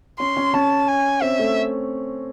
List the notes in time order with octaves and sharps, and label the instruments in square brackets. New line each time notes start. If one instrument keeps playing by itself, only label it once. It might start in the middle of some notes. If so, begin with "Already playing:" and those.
[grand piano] C#4 [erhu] C6
[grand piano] C#4
[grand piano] C#4 [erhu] A5
[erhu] G#5
[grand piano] C4 [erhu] E5
[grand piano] A3